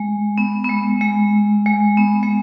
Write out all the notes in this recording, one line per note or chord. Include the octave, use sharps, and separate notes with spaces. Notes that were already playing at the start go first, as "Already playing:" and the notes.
Already playing: G#3
B3
B3
G#3
G#3
G#3
B3
G#3